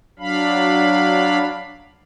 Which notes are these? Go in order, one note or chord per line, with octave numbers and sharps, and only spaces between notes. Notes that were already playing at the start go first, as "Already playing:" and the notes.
F#3 D4 F5 B5